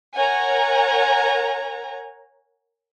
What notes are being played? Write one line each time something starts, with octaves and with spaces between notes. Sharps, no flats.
A#4 C#5 F#5 G#5 A#5